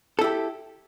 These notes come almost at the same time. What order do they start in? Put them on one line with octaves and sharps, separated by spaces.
A4 E4 G4